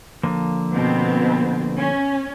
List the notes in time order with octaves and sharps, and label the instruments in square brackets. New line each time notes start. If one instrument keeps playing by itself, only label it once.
[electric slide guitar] D3 F3 A#3
[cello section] B2 B3 C4
C#4